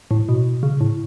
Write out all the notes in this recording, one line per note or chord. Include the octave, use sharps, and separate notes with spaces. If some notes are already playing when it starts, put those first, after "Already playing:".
A2
B2
C#3
A2